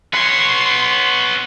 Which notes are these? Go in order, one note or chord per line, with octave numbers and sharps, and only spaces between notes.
B3 C#5 C6